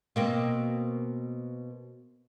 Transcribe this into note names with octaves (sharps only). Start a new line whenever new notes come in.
B2 A#3 C4